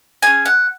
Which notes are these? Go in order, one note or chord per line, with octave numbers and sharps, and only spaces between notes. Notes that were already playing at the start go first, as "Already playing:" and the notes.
C#4 G#4 G#5
F#5